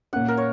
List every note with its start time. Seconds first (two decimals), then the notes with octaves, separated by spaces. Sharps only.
0.13 A#2 A#3 C#4 F#5
0.28 A#4
0.37 C#5